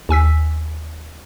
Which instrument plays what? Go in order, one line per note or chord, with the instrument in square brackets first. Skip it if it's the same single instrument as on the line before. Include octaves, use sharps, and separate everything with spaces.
[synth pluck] D#2 G#5 E6 B6